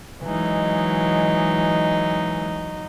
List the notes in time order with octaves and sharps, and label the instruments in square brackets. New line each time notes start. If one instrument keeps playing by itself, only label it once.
[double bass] E3 G#3 [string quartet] F#3 D#4